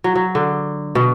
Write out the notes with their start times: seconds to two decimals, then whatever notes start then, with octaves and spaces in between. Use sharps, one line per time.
0.04 F#3
0.15 F#3
0.35 D3
0.95 B2